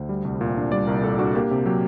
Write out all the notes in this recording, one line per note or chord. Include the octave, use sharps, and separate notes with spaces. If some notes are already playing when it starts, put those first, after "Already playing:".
Already playing: D2 C5
G3
C2
A#2
D4
G3 D5
C2 A#4
A#2 A4
D4 F#4
A#3 G4
C3
F#3 G4